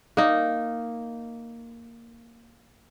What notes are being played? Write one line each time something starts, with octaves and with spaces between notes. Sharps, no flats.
A#3 D#4